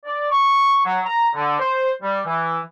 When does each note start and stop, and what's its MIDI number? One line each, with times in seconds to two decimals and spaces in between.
0.05 0.27 74
0.30 0.82 85
0.84 1.00 54
1.05 1.28 82
1.35 1.58 50
1.59 1.90 72
2.03 2.20 55
2.26 2.59 52